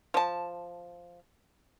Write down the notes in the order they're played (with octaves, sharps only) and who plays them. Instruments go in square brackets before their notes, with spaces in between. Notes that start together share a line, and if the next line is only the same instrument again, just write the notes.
[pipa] F3 A5